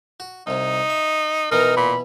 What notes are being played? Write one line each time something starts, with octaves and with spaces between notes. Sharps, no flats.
F#4
C2 C3 D#4
E5
B2 E3 D#4 A#4
A#2 B5